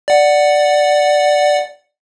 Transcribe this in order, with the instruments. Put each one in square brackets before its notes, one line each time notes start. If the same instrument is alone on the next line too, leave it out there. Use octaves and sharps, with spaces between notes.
[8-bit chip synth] D5 F#5